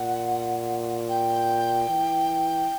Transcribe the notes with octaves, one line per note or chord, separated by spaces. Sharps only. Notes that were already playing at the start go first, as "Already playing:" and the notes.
Already playing: A#2 F#5
G5
E3